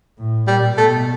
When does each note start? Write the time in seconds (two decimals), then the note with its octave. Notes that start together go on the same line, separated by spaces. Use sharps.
0.18 A2
0.47 A#2 G3
0.77 B2 A3